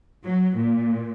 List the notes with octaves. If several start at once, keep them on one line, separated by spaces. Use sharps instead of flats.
F#3
A#2